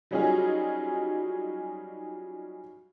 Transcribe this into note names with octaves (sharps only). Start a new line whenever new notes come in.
F#3 G3 C#4 D#4 F4 G#4